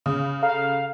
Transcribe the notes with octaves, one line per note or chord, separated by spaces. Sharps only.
C#3 D#6
A4 F5 A#5